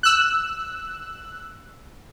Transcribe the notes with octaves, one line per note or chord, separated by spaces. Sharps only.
E6 F#6